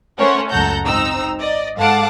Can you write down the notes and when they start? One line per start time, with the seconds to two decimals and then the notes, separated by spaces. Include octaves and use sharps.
0.18 A3 C#4 A#4 C5 C#5 F#5
0.50 C#2 F#2 A4 F#5 A#5 G6
0.84 G#1 C4 D#4 A#5 E6
1.39 D5 D#5
1.78 G#2 A4 F5 F#5 A5 D6